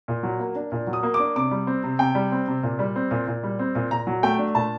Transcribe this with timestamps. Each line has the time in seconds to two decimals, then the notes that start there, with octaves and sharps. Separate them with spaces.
0.08 A#2
0.23 F#3
0.39 A#3
0.55 D4
0.72 A#2
0.87 F#3
0.93 D#6
1.03 A#3
1.14 D6
1.19 D4
1.36 C3 D6
1.51 G3
1.67 C4
1.84 C3
1.99 C3 G5
2.15 G3
2.32 C4
2.48 C3
2.63 A#2
2.79 G3
2.96 C4
3.11 A#2
3.27 A#2
3.43 G3
3.59 C4
3.75 A#2
3.91 A#2 A#5
4.07 F#3
4.23 A3 G5
4.38 D4
4.55 A#2 A5